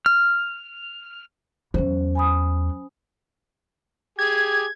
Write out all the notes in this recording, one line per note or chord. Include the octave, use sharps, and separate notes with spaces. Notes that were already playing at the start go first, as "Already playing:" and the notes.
F6
E2 F#3 C#4 C5
G#5 B5 D#6
G4 G#4 G#6